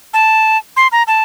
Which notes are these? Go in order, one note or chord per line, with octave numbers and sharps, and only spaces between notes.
A5
C6
A#5
A5